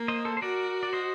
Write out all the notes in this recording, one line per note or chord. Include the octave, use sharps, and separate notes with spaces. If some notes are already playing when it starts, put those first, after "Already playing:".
Already playing: A#3
C5 D#5
A4 C5
C5
F#4 A#4 D5
D5
C5 D#5